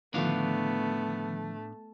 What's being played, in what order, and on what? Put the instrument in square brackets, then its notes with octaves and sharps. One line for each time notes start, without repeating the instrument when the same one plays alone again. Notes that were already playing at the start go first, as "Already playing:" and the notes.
[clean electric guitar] A2 D4 F5 [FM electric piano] D3 D#3 F3 [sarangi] A3 [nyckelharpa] B3